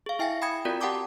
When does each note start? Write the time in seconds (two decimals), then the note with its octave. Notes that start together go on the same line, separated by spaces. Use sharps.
0.06 G#4 F5
0.19 E4 E5 G5 G#5 A#6
0.42 G5 B5 D#6 G#6 C#7
0.65 C4 F4 F#4 A#4 D5
0.81 G4 F#5 G5 A5 D6 D#6